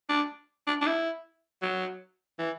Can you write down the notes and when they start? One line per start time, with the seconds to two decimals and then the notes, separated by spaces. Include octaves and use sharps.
0.09 D4
0.67 D4
0.82 D4
0.87 E4
1.62 F#3
2.39 E3